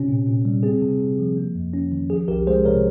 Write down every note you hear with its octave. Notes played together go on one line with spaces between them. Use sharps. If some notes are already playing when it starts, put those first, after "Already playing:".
Already playing: C3 C#4
A#2
A#2
G3
C4 G#4
C3
C3
F3
A#3
F2
C#4
D#3
F3 G#4
C2 G4 A#4
G#3 G#4 C5
C3 A#4 C#5